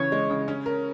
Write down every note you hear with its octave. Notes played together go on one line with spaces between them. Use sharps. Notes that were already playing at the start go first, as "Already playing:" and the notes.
Already playing: C#3 E3 C#5
G#3
C#3
C#4
A#4